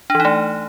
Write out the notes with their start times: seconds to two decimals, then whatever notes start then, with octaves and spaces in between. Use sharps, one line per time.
0.10 D4
0.15 E3
0.20 D#4
0.25 A3